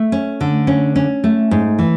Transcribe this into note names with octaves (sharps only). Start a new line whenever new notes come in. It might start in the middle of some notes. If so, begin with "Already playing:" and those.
Already playing: A3
C#4
D3
C#4
C#4
A3
G#2
E3